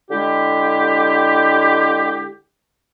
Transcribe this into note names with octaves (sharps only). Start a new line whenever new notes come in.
D3 G#3 E4 G4